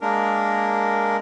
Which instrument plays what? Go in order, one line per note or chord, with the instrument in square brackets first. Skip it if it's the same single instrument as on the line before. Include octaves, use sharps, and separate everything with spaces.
[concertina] G#3 A#3 D4 A#4